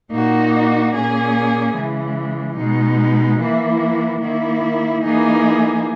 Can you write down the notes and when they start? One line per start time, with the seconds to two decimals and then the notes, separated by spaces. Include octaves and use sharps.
0.12 A#2 A#3 D#4 F#4
0.93 A#2 A#3 C#4 G#4
1.75 C#3 E3 G#3
2.57 B2 G#3 D#4
3.39 E3 A#3 E4
4.21 D#3 A#3 E4
5.03 E3 A#3 D#4 G#4